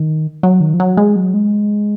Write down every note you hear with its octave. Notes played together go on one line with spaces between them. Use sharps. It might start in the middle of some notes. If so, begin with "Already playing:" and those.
Already playing: D#3
F#3
D#3
F3
F#3
G#3
F#3
G#3